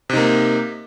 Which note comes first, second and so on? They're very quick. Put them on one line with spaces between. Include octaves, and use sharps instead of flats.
C3 D#4 A#3